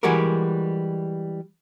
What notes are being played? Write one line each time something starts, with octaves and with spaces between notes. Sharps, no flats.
E3 G3 G#3 F#4 G4 A#4